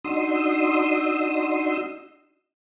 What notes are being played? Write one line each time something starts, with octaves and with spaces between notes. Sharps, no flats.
D4 D#4 F#4 C6 D#6 E6